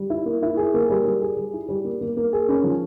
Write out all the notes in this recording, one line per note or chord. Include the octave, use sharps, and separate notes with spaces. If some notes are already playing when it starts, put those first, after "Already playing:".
Already playing: G3
E4
A#3
E4
G#4
A#3
G3
G3
G#4
G3
E4
G3
A#3
A#3
A#3
G#4
C#4
F3